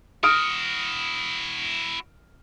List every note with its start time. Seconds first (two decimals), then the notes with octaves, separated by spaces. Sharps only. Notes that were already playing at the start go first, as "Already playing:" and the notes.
0.23 E4 F#4 D#6 F6 D7